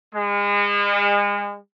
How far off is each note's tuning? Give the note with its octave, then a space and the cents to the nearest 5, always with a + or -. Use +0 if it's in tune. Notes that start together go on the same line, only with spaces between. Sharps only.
G#3 -35